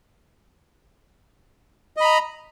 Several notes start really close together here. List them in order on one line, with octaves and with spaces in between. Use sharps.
D#5 B5 A#5